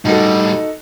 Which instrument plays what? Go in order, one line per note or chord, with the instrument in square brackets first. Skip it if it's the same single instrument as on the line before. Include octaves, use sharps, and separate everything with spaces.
[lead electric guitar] A2 G3 [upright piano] D#4 F#4 A4